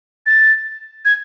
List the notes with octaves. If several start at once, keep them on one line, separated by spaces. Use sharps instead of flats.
A6
G#6